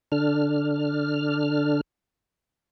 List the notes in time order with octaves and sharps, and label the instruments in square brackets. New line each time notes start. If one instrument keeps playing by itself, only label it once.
[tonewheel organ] D3 D4 F6